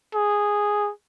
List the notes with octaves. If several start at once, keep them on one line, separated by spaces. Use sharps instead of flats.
G#4